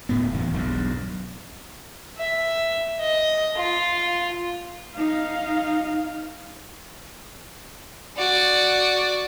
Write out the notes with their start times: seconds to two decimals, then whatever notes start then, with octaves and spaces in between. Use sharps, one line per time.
0.09 D1 A2 B3
0.34 D#1 E2 D#3
0.54 B1 E2 G2
2.18 E5
3.01 D#5
3.57 F4
4.95 D#4 F5
8.17 F#4 D5